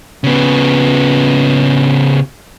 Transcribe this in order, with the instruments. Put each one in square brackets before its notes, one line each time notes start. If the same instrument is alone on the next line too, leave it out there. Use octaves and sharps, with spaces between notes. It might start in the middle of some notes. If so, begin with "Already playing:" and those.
[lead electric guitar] C#3 B3